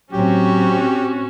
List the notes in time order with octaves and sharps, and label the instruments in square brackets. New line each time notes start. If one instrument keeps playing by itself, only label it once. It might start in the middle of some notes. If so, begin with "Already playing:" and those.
[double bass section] A2 C4 [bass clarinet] F#3 [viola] C#4 F#4 [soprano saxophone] G4